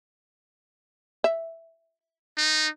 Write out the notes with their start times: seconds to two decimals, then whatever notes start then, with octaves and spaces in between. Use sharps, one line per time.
1.24 E5
2.38 D#4